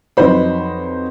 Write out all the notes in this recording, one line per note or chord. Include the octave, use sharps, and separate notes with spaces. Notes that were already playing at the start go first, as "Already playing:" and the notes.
F2 F#3 D#4 B4 C5 B5